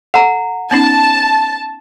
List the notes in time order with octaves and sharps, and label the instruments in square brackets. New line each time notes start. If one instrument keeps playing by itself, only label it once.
[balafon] A4 [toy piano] F#5 A#5
[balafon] B3 C#4 D#4 [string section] A5